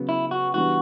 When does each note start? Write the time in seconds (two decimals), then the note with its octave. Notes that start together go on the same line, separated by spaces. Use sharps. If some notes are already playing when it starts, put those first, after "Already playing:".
Already playing: C#3 F#3 B3
0.09 E4
0.31 F#4
0.54 E3 G3 B3 D4 F#4